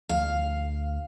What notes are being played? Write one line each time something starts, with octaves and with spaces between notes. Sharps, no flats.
D2 F5